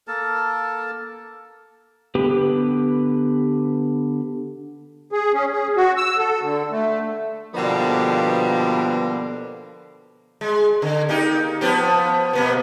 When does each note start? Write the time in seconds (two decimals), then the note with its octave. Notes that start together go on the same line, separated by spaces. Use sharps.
0.08 A#3 A4 A#4 A5
2.15 D3 B3 G4 B4
5.12 G#4
5.34 C#4
5.52 G#4
5.76 F#4
5.97 E6
6.18 A4
6.41 D3
6.71 A3
7.55 B2 D3 F3 G3 A#3 B3
10.41 G#3
10.82 D3
11.09 A#3 D#4 G4
11.61 F3 B3 G4
12.33 B2 A#3 B3